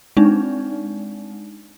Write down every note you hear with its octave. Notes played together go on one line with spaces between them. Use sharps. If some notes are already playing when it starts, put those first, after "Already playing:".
G#3 C4 D4 D#4